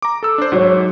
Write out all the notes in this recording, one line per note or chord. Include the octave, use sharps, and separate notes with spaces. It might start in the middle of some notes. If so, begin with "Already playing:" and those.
A#5 D6
A4 E6
D4 C5
G#2 F#3 C#5